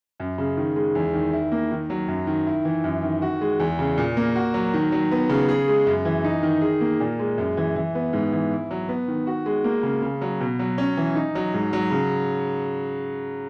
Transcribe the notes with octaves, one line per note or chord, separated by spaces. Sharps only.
F#2
C#3
D#3
G#3
E2
D#3
E4
A#3
D#3
F#3
F#2
D#3
E4
E3
F#2
D#3
F#4
G#3
E2
C#3
A#2
A#3
F#4
F#3
D#3
F#3
B3
C#3
G#4
G#3
F#2
E3
D#4
D#3
G#4
A#3
A#2
G#3
F#2
E3
E3
B3
G#2
E3
E4
F#3
B3
D#3
F#4
G#3
A#3
C#3
C#3
F#3
B2
F#3
C#4
E3
D#4
F#3
G#2
F#3
C#3